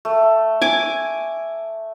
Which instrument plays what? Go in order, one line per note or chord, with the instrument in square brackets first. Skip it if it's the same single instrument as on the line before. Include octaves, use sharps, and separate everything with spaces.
[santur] A3
[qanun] G#5 D6